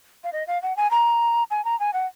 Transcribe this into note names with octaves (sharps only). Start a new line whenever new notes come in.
F5
D#5
F5
F#5
G#5
A#5
G#5
A#5
G#5
F#5